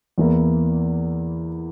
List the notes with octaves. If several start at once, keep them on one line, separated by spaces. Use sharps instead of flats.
E2 E3 A#3 E4